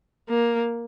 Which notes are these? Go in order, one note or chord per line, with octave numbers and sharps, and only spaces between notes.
A#3